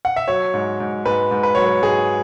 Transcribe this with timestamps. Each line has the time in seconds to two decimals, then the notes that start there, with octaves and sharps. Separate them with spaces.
0.05 F#5
0.16 E5
0.28 F#3 C#5
0.54 G#2
0.80 G#2
1.05 G#2 B4
1.31 G#2
1.43 B4
1.55 F#3 C#5
1.66 B4
1.82 G#2 G#4